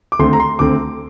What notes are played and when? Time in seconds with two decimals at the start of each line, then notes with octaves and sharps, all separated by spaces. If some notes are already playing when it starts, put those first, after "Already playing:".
0.12 D6
0.19 D2 D3 A3 C4 C6
0.33 A#5
0.40 C6
0.59 D2 D3 A3 C4 D6